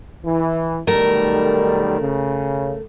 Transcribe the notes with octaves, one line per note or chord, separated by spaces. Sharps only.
E3
B1 D#3 G3 A3 A#4
C#3